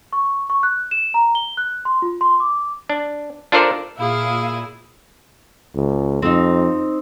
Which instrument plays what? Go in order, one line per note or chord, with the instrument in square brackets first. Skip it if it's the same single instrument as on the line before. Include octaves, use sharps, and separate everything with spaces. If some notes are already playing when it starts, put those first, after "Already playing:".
[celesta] C#6
C#6
F#6
E7
A#5
G7
F#6
C6
F4
C6
D6
[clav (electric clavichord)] D4
D4 F4 A4 A#4 C5 D5
[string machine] A#2 [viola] E4 G#4 [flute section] F5
[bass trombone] C#2
[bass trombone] F2 [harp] C4 D#4